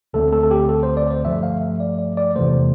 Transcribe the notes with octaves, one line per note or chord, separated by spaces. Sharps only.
D2 D3 A3 C4 A4
A4
A4
G4
A4
C5
D5
C5
G2 F3 A3 E5
F5
E5
D5
D5
D5
E2 C3 E3 A3 C5